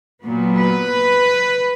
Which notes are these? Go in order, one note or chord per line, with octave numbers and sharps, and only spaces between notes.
A#2 F#3 B3
B4